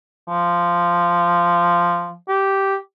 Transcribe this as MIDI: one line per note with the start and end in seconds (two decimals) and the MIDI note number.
0.28 2.15 53
2.28 2.75 67